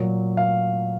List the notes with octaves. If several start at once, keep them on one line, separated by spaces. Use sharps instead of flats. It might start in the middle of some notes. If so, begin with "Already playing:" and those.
Already playing: A#2 F#3
F5